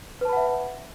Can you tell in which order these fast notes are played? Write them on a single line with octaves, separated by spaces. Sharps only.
B4 A5 B5 F#5 E5